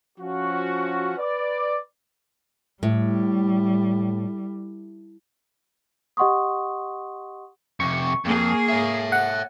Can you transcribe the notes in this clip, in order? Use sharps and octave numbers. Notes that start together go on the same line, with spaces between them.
F3 C#4 F#4
B4 D5
A2 G3
G4 D#5 F#5 C6 C#6 D#6
F2 C3 C#6
F2 A#3 G#4
C#5 E5
F#5